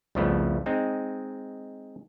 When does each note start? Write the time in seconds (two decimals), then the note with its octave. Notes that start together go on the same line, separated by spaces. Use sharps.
0.15 C2 F2 C#3 F3 A3 B3
0.66 G#3 C4 D#4